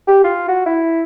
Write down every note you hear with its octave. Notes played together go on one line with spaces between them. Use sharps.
G4
F4
F#4
E4